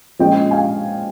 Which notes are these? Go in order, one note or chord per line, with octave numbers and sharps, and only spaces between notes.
A#2 F3 G#3 C#4 D#5 G5
F5 G#5